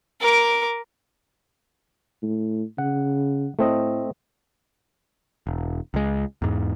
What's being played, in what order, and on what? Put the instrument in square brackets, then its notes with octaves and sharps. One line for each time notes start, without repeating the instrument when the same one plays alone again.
[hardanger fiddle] A#4 D6
[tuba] A2
[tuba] C#3 [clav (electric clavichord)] F#5
[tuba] A2 [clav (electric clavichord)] A3 C4 D#5
[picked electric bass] E1
C#2 G#3
E2 G#2